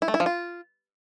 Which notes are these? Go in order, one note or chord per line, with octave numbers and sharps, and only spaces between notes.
E4
A3
E4
F3
F4